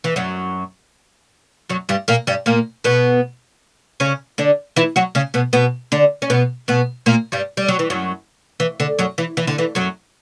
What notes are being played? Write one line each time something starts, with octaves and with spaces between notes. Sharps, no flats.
E3
F#2 F#3
F#2 F#3
G2 G3
A#2 A#3
G2 G3
A#2 A#3
B2 B3
C#3 C#4
D3 D4
E3 E4
F#3 F#4
C#3 C#4
B2 B3
B2 B3
D3 D4
C#4
B2 B3
B2 B3
A#2 A#3
G2 G3
G3
F#3
E3
F#2 F#3
E3
D3
F#2 F#3
E3
E3
D3
E3
F#2 F#3